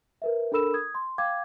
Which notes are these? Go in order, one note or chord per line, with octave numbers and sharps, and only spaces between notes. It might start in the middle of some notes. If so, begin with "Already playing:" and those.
A#4 B4 E5
D4 A4 A#4 B5 E6 E7
D#6 G#6
C6
F5 G5 D6 G#6